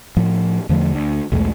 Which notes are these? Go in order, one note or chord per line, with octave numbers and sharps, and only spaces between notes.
A2 F3
E2 D3 F3 A3
D2
B1 E2 G#3 A3